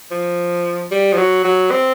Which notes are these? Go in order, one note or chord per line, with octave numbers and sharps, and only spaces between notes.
F3
G3
F3
F#3
F#3
C4